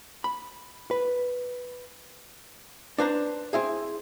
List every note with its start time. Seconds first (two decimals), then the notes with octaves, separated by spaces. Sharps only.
0.24 B5
0.91 B4
2.98 D4 B4 C5 A#5
3.53 C4 E4 G#4